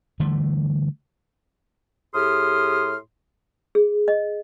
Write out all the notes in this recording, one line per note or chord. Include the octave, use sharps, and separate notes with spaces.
D3 E3 G3 A3
A2 G4 G#4 C6 D#6 F6
G#4
D#5